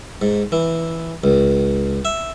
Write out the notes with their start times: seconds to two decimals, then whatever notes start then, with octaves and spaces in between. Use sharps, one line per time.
0.22 G#2
0.52 E3
1.24 C#2
2.05 E5